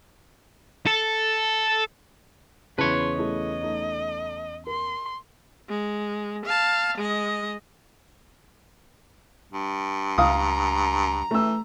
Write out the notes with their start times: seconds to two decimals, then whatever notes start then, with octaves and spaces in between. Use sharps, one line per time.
0.86 A4
2.78 E2 C#3 E4 B4 C#5 A5 B5 C6
3.18 A3 E4 G#4 D#5
3.61 A3 D#4
4.67 A#4 C6
5.69 G#3
6.45 F5 A5
6.98 G#3 D#5
9.52 G2
10.18 C#2 F5 A#5 D#6
11.31 E3 A3 E6